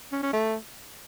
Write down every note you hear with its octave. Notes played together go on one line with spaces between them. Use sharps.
C#4
C#4
A3